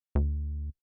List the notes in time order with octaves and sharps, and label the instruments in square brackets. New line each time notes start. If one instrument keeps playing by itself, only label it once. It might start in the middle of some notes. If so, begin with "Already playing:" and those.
[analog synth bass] D2